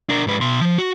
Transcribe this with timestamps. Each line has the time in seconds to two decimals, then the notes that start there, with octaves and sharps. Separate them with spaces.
0.09 D4 A#4
0.27 G#2 B4
0.41 B2 C6
0.61 F3
0.78 F#4